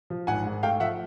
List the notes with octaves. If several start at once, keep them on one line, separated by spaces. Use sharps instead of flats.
F3
G#1 F#5 G#5
G#2
A3 F5 G5
F3 E5 F#5